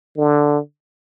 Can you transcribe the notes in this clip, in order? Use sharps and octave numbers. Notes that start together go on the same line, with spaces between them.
D3